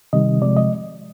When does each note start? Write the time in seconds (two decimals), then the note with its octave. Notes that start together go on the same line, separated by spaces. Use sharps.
0.13 C3 D#3 G3 D#5
0.42 C3 F3 G#3 D5
0.57 D#5